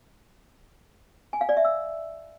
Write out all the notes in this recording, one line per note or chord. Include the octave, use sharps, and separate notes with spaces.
G#5
F5
D5
E5
E6